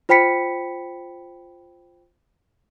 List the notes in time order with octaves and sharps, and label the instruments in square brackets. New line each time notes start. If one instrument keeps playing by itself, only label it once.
[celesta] F4 C5 G5 B5 B6 C#7